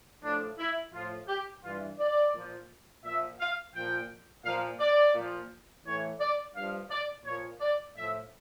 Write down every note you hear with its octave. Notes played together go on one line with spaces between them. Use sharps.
A2 F3 D4
E4
A2 F3 F4
G4
G2 E3 F4
D5
A#2 F3
A#2 F3 E5
F5
A#2 F3 G5
A#2 F3 F5
D5
A#2 F3
A2 E3 C#5
D5
G2 F3 F5
D5
A#2 F3 C#5
D5
A2 F3 E5